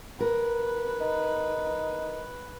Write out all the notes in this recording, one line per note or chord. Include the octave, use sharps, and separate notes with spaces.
A#4 B4
D#4